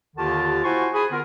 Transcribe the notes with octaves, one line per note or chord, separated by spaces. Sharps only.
D#2 D3 D#3 F4 G4 A5
E4 F#4 C5 G#5 C6 C#6
G#4 G#5 B5
D3 B3 F4 A#4